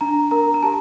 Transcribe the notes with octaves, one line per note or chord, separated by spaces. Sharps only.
D4 A#5
A#4 A#5
A#5
G4 A5